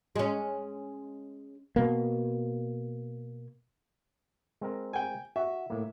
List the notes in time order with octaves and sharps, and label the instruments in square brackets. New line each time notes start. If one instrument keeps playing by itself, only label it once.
[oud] G#3 C#4
[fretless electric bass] B2 A#3
[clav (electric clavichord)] G#3 C4 A#4
[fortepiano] G5 G#5
[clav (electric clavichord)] F#4 [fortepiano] E5
[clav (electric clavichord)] A2 A#3